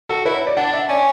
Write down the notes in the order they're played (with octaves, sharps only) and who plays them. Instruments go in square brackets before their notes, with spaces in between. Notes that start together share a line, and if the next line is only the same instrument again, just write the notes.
[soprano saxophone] F#4 [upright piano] A4
[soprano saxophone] E4 [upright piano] B4
[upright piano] C#5
D5
[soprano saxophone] D4 [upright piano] F#5
[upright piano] E5
[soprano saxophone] C#4 [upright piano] D5